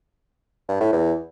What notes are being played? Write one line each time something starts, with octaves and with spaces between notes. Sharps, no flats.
G2
A2
E2